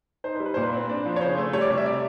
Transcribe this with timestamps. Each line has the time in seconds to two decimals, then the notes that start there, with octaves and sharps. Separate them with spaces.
0.24 D#4 C5
0.35 B4
0.40 G3
0.46 B4
0.54 A#2 C5
0.63 B4
0.73 C4
0.89 D4
1.06 F3
1.16 C#5
1.21 C#3 C5
1.37 A3
1.53 G3 C#5
1.61 D5
1.70 C3
1.78 E5
1.86 D5